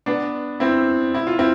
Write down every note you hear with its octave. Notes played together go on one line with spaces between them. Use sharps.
B3 D4
C4 E4
E4
F4
C4 E4